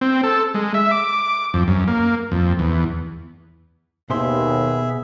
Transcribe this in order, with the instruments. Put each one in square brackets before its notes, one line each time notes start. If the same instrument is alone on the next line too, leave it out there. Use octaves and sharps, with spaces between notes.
[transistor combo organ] C4
A4
G#3
E5
D6
F2
F#2
A#3
F2
E2
[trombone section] D#2 [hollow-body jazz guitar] B2 C5 C6 [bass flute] B3 [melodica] G#4 E5